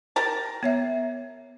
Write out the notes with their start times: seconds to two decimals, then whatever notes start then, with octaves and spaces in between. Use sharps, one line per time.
0.16 G4 A#4 A5
0.63 B3 C#5 E5